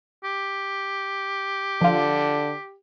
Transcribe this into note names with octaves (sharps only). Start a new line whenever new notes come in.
G4
D3 F3 F4